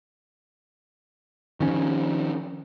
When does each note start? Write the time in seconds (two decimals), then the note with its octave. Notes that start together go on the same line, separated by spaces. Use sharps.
1.60 D#3 F3 C#4